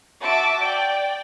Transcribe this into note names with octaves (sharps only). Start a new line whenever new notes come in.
F#4 E5 A5 D6
D5 G5